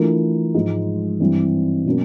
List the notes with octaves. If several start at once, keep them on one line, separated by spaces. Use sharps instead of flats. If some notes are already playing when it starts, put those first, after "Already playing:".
Already playing: E3 A3 D4 F4 A#4
G#2 F3 G#3
G2 E3 G3 C4
B2 F#3 A#3 C#4